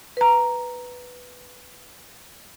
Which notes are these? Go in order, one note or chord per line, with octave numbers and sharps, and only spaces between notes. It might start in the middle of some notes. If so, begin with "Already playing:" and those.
B4 A#5